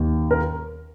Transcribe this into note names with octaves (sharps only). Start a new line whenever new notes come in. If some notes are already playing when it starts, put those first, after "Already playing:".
Already playing: D#2 D#3
A#4